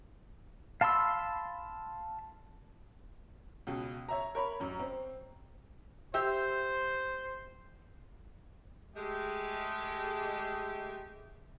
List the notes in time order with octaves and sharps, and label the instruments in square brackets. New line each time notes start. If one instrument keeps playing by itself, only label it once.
[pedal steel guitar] F5 A5 B5 C6 E6
[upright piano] C#2 B2
C#5 E5 A#5
A#4 C#5 B5
A1 F#2
C4
[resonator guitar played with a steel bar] G4 E5 [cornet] C5
[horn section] G#3 A3 G4